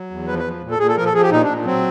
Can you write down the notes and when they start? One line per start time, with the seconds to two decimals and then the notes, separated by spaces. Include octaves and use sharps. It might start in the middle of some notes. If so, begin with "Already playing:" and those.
Already playing: F#3
0.10 E2
0.27 F3 B4
0.39 B4
0.45 F3
0.62 A#2
0.71 A4
0.79 A#2 G#4
0.88 A4
0.96 F3 A#4
1.06 A4
1.14 F3 G#4
1.22 G4
1.31 A#2 D#4
1.43 D4
1.48 A#2
1.65 F#3 C4